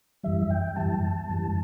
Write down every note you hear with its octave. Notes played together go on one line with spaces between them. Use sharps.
F#2 E3 G3 E5
G5
F#2 E3 G3 A5
F#2 E3 G3